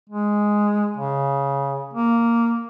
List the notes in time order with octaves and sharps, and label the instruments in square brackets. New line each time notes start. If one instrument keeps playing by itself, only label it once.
[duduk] G#3
C#3
A#3